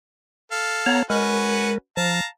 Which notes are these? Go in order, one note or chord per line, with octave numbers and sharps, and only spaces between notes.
A4 F5
B3 C#5 A#5
G#3 C#4 F#4 A#4 B4
F3 F5 A5 A#5